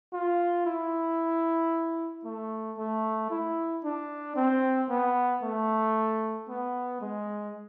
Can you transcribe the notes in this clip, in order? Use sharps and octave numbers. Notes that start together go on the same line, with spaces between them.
F4
E4
A3
A3
E4
D4
C4
B3
A3
B3
G#3